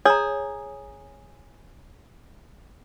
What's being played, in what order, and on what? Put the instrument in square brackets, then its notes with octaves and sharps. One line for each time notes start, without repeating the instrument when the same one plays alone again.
[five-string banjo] G#4 [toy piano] C#5 A#5